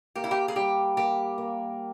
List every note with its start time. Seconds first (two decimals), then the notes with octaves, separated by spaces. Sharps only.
0.16 A#3 G4
0.24 E4
0.31 G4
0.48 G#4
0.56 G3 G4
0.97 A#3 G4
1.38 A#3